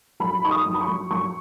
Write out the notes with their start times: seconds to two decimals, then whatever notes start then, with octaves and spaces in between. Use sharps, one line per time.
0.20 F#3 B5
0.43 D#4 C#6
0.51 D#6
0.65 F#3
0.74 B5
0.81 C#6
0.88 F#3
1.11 F#3 C#6